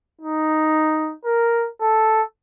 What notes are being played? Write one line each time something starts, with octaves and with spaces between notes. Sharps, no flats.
D#4
A#4
A4